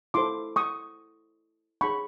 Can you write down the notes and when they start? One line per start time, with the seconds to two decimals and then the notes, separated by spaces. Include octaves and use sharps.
0.14 E4 A4 C5 C6 D6
0.56 C#6 D#6
1.81 D#4 G#4 C#5 B5 C#6